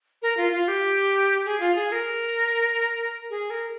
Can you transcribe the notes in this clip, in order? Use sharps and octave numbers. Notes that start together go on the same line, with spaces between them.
A#4
F4
F4
G4
G#4
F4
G#4
A#4
G#4
A#4